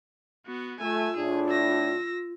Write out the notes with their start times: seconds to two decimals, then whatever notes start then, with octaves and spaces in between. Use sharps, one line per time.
0.46 B3 F#4
0.81 A3 F4 G#5 E6
1.17 A2 D4 G#4
1.50 E6 A#6